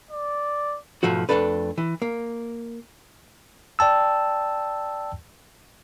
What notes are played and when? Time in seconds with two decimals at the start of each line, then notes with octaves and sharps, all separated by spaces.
0.11 D5
1.03 B1 G#2 F3 A3 F#4
1.29 F2 A#2 A3 D4 A4 B4
1.78 E3
2.02 A#3
3.79 D5 G5 A5 E6